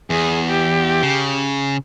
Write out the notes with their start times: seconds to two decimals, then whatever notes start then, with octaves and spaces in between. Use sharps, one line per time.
0.10 E2 G#4
0.48 G4
1.03 C#3